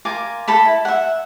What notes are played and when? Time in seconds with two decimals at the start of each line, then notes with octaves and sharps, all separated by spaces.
0.05 F4 A#4 G#5 D6
0.48 A4 A5 B5
0.65 E4
0.85 E5 F#5